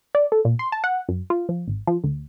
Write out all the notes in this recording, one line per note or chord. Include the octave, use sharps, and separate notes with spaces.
D5
A4
A#2
C6
A5
F#5
F#2
F4
F3
G#1
F3
D2